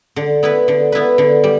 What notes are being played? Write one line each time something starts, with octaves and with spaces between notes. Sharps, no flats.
D3
B3 E4 B4
D3
B3 E4 B4
D3
G3